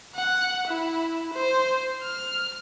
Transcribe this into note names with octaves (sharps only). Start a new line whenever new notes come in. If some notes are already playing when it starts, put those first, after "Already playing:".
F#5
E4
C5
F6